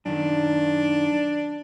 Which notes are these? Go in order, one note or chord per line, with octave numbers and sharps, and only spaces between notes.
F#2 D#3 D4